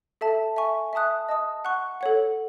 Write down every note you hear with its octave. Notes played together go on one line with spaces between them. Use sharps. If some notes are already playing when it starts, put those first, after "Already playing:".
A4 E5 A5
E5 G#5 C#6
E5 A5 D#6 F#6
D#5 A5 D#6
F#5 C#6 F#6
A4 C#5 F#5